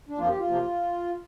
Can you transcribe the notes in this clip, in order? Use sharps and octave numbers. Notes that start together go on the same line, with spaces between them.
D4
F2 F3 A#3 F4
G4
F4
C3 F3 A#3